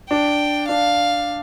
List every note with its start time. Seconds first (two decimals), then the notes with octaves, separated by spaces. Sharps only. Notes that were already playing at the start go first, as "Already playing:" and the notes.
0.10 D4 G5
0.68 D4 F5